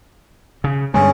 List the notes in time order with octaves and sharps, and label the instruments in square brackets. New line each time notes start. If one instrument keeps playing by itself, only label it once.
[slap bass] C#3
[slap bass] G2 D3 G#3 [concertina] C#4 G#4